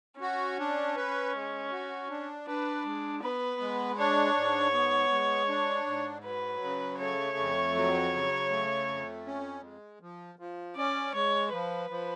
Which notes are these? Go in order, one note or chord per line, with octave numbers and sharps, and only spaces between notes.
C#4 F#4
D4
B4
G#3
F#4
D4
D4 B4
G#3
B3 B4
G#3
D4 C#5
G#2
B3
G#3
D4
G#2
F#3 B4
C#3
A3 C#5
F2
F#3
C#3
A3
F2
C#4
G#3
F3
F3
C#4 D5
G#3 C#5
F3 B4
F3